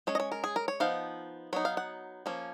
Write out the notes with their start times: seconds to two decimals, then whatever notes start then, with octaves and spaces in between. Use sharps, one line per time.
0.07 G#3 C#4 C#5
0.15 D#5
0.20 C#5
0.32 A#4
0.44 G#4
0.56 A#4
0.68 C#5
0.80 F3 B3 D#4 F5
1.53 F#3 B3 D#4 C#5
1.65 F5
1.77 F#5
2.26 F3 A#3 C#4